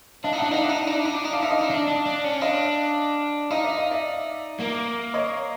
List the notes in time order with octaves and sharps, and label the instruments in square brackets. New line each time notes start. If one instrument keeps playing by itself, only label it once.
[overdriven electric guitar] D4 [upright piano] D#5 F5
[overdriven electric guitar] D#4
[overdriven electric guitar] D4 [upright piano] E5 F#5
[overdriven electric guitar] D#4 [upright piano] D#5 F5
[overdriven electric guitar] D4
[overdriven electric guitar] D#4 [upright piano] E5 F#5
[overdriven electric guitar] D4
D#4
D4
D#4
D4
D#4
[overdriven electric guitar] D4 [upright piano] F5
[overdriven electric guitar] D#4 [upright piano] E5
[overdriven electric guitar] D4 [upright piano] D#5 F5
[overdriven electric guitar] D#4
D4
D4
D4
C#4
[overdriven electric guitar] D4 [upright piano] D#5 F5
[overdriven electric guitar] D#4 [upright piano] D#5 F5
[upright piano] D5 E5
D#5 F5
D5 E5
[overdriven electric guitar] A#3
[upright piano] C#5 D#5